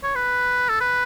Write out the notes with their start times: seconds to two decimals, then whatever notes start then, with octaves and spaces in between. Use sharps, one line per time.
0.03 C#5
0.15 B4
0.69 A4
0.80 B4